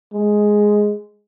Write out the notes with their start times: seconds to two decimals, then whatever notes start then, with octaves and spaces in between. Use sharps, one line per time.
0.13 G#3